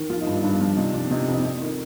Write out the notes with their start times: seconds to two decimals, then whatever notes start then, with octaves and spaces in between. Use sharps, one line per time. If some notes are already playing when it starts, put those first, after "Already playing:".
Already playing: D#3
0.10 F3 F4
0.21 D#4
0.27 G2
0.32 D4
0.44 G2 D4
0.60 F3
0.77 C3 D#4
0.94 F3 D4
1.11 C3 D#4
1.28 F2
1.33 D#4
1.45 F2
1.62 D#3